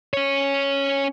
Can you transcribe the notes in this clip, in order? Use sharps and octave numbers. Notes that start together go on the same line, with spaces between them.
C#4 C#5